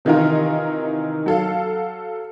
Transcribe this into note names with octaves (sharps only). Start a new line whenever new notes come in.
C3 D#3 E3 D#4 F4 A#4
F#3 A4 F5